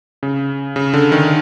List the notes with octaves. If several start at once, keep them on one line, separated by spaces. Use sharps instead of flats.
C#3
C#3
D3
D#3